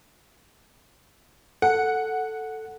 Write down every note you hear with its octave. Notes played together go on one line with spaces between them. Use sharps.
A4 F#5